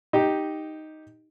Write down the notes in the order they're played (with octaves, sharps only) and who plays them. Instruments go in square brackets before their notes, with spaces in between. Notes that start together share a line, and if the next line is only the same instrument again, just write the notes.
[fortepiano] D#4 G4